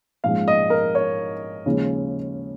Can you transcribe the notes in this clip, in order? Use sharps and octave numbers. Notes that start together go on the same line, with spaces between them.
A#1 G#2 F3 G#3 C#4 F5
D#5
A#4
C#5
D#2 C#3 F3 G#3 C#4